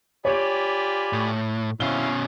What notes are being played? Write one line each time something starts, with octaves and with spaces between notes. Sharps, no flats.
F4 G4 C#5 D5 G#5 B5
A2
B2 C4 C#4 E4 F5 G7